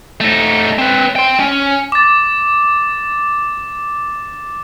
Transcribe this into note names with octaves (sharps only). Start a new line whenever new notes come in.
A3 D#4
C4 B4
G5 C6
C#4
D6 A6